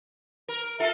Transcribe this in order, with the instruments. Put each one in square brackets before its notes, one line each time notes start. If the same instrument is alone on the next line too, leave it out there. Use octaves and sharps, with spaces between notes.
[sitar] A#4
[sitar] F4 A4 [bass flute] E5